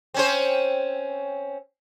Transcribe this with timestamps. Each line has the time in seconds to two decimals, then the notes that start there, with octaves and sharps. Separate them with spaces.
0.14 C4 C#4 C5